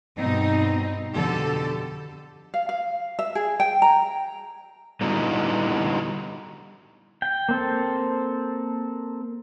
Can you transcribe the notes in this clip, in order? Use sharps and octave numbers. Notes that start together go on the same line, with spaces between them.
G2 B2 C4 D#4
F2 B2 D3 G4 A4
F5
F5
E5
G#4
G5
A#5
D3 G3 B3 D#4 E4 F#4
G5
A#3 C4 A4